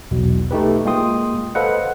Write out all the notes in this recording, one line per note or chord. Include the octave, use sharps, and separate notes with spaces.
B1 E2 B2
A3 D#4 G4 B4
G#3 A#3 F4 G5 C6 D#6
A4 B4 C5 D#5 F5 F#5